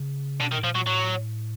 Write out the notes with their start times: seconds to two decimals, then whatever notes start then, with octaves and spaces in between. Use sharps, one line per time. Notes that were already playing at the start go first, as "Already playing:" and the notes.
Already playing: C#3
0.40 B2 D3
0.52 D#3
0.58 A2
0.64 A#2 F3
0.75 F#3
0.86 A2 F#3